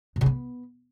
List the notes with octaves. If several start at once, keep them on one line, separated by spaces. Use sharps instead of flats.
B2
C#3
B3